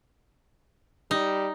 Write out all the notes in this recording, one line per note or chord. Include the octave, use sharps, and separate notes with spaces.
G3 D#4